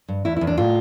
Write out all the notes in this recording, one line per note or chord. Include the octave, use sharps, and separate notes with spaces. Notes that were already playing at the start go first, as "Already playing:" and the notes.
G2
E2 E4
E4
E2
D4
A2 F4